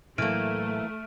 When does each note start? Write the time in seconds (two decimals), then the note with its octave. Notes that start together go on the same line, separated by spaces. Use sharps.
0.18 A2 E3 F#3 A3 A#3 F6 D7 D#7